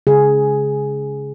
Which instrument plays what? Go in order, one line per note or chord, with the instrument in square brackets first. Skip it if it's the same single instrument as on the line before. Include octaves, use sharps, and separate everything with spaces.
[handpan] C#3 G#3 G#4